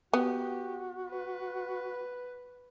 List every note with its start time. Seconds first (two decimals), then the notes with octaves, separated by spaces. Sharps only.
0.13 B3 F#4 G4
1.09 B4